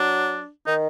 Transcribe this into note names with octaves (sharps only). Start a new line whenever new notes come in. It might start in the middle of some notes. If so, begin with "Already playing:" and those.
Already playing: F#3 D4
D#3 D#4